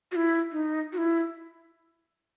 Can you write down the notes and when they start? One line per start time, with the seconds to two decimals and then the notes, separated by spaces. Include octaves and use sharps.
0.12 F#4
0.16 E4
0.52 D#4
0.93 F#4
0.97 E4